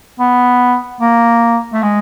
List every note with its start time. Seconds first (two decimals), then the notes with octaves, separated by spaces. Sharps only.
0.20 B3
1.01 A#3
1.73 A3
1.83 G#3